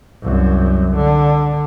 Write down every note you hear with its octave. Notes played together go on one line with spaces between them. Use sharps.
C2 F#2
D3